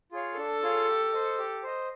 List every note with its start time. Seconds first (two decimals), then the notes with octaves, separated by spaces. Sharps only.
0.12 F4 G#4 C#5 F5
0.37 D4 A4
0.62 F4 G#4 C#5 F5
0.88 G4
1.13 C5 D#5
1.38 G4
1.63 C5 D#5